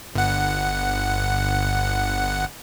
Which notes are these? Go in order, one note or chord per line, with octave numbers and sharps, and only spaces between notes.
G1 F#5